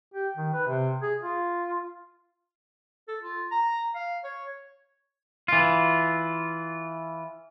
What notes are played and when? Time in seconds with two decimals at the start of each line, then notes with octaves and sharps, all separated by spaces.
0.14 G4
0.37 D#3
0.53 B4
0.67 C3
1.02 G#4
1.22 F4
3.08 A4
3.22 F4
3.51 A#5
3.95 F5
4.24 C#5
5.48 E3 F4